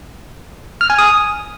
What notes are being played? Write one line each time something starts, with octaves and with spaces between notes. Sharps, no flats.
F6
G#5
D#6